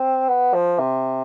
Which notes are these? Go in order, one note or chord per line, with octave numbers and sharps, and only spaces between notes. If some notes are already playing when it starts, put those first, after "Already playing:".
Already playing: C4
B3
F3
C3